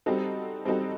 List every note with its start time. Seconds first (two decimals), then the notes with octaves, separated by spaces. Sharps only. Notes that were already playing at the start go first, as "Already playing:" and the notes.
0.06 G3 C4 D#4 F#4 A4
0.65 G3 C4 D#4 F#4 A4